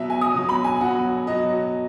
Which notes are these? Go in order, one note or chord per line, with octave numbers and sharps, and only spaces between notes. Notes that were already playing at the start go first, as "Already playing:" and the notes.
Already playing: B2 F#3 E5
G#5
D#6
B2 F#3
B5
G#5
B2 F#3 F#5
B2 F#3 D#5